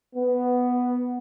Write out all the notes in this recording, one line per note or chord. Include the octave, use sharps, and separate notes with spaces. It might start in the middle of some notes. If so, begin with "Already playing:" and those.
B3